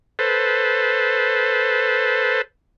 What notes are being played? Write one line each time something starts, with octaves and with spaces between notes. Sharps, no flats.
A4 B4 C5